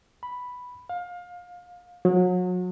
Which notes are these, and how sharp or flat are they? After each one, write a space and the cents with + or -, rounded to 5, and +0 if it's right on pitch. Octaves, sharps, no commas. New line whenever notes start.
B5 +0
F5 +25
F#3 -35